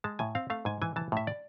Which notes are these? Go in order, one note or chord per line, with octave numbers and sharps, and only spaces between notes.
G#3 A5
A2 G#5
C4 F5
A3 F5
G#2 G#5
E3 G#5
E3 A5
A2 E5
D5